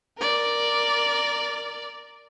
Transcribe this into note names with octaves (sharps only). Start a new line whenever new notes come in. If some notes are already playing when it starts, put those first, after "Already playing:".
A#4 D5